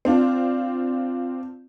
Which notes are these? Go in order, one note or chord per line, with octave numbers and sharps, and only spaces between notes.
C4 D4 F4